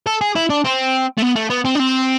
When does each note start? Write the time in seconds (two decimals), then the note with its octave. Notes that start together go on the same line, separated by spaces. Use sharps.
0.07 A4
0.21 G#4
0.35 E4
0.50 D4
0.64 C4
1.18 A3
1.22 B3
1.36 A3
1.50 B3
1.65 C4
1.75 D4
1.79 C4